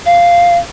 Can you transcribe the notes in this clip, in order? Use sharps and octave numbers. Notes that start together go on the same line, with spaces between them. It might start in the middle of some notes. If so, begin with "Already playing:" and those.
F5